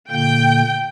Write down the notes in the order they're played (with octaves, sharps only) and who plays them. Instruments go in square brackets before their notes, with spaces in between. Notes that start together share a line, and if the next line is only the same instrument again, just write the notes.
[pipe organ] A#2 D3 A#3 [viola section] G5